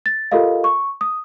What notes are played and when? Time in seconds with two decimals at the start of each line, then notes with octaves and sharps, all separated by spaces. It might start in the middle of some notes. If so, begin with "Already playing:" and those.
0.06 A6
0.32 F4 G4 A4 A#4 D#5 F5
0.64 C#6
1.01 D#6